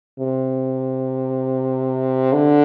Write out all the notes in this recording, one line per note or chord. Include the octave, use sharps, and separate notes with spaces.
C3
D3